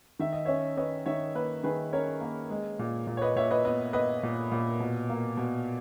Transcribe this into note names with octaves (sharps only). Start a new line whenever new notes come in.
D#3 E5
D#5
C#4 C#5 E5
C#4 B4 D#5
D#3 C#5 E5
A#3 B4 D#5
D#3 G#4 B4
C#4 A#4 C#5
A#3
G#3
A#2
A#2
C#5
B4 D#5
A#2 C#5 E5
B4 D#5
B3 B4 D#5
B3 B4 D#5
A#2
A#2
B2
A#3
B2